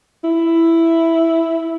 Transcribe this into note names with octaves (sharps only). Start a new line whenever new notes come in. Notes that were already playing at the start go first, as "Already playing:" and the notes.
E4